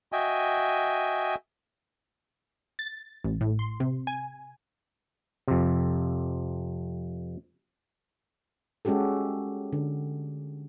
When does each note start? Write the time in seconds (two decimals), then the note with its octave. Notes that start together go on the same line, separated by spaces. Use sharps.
0.12 F#4 D#5 E5 G5 G#5
2.79 A6
3.24 A1
3.41 A2
3.59 C6
3.80 C3
4.07 G#5
5.48 F2 C3
8.85 G#3 C#4 F#4 G4 A4
9.72 D3